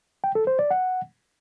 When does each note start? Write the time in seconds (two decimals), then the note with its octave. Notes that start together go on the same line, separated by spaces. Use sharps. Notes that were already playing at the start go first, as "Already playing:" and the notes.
0.24 G5
0.35 A4
0.47 C5
0.59 D5
0.71 F#5